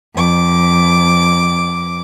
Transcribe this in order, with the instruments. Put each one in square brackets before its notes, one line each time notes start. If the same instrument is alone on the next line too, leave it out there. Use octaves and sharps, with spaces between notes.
[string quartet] F2 D6